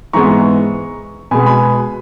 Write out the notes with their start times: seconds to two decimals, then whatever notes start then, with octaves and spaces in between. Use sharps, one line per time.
0.13 G#2 E3 G#3 B3 A#5 C#6
1.31 B2 G#3 B3 G#5 B5
1.46 G#5 B5